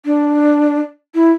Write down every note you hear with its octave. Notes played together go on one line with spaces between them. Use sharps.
D4
E4